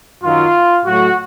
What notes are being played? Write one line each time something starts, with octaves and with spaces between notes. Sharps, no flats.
F#2 D#3 F#3 F4
A2 F#3 A3 F#4